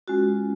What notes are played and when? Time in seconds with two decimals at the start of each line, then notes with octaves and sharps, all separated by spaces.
0.08 G#3 C#4 F4 F#4